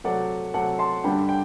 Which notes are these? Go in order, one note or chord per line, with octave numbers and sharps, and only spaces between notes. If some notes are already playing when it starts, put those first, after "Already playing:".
C3 F#3 A3 D5 F#5
C3 F#3 A3 F#5 A5
A5 C6
G2 D3 G3 D4 G5 B5
G5